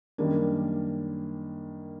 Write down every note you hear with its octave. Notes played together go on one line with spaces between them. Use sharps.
F#2 D#3 G3 A#3 D4